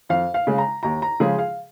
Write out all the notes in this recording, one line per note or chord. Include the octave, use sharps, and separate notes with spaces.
F2 F5
F5
C#3 G#3
A#5
D#2 A#5
A#5
C#3 F3 G#3 G#4
F5